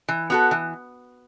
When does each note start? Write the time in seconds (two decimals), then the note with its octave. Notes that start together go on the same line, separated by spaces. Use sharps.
0.08 E3
0.30 B3 F#4 A4
0.51 E3